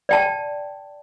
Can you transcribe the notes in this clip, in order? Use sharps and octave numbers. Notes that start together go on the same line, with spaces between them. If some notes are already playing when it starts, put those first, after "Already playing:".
D5 G5 A5